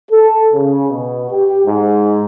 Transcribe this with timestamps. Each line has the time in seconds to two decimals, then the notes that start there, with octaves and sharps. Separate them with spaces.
0.10 A4
0.54 C#3
0.89 B2
1.31 G4
1.66 G#2